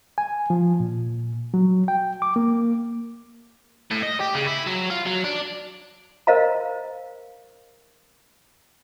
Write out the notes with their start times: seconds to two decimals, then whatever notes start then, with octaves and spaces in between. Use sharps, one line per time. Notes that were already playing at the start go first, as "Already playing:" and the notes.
0.18 G#5
0.50 F3
0.80 A#2
1.54 F#3
1.88 G5
2.22 D6
2.36 A#3
3.91 A2
4.03 D#5
4.21 G4
4.35 C#3
4.47 E4
4.67 F#3
4.90 F4
5.06 F#3
5.24 D4
6.27 A#4 C5 D#5 F5 A#5